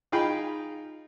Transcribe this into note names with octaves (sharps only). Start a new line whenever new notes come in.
D#4 F4 G#4 F5 G5 B5